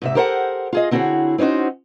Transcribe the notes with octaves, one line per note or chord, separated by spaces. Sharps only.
G#2 C3 E5
G4 A4 A#4 C5 F5 F#5
F4 G#4 D#5
D3 C4 E4 F#4 G#4 C#5
C4 C#4 D#4 F#4 C5